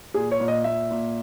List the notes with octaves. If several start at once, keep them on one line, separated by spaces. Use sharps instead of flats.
A#2 G#4
C#5
A#2
D#5
A#2 E5
A#2